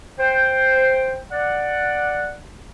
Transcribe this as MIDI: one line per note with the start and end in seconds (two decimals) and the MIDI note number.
0.19 1.18 72
0.19 1.18 79
1.32 2.33 74
1.32 2.33 78